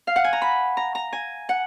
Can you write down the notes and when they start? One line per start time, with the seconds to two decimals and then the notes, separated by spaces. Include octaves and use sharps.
0.07 F5
0.16 F#5
0.24 G#5
0.33 A#5
0.42 B5
0.77 A#5
0.95 A#5
1.13 G#5
1.49 F#5